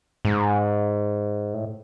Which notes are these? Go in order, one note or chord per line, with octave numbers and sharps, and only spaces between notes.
G#2
A2